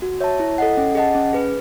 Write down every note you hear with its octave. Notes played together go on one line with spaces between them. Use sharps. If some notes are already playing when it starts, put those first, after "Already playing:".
F#4
C#5 E5 A5
E4
A4 D#5 F#5
C#4
G#4 D#5 F#5 A5
C#4
G#4 B4